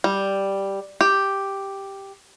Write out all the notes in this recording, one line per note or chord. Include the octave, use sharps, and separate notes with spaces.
G3
G4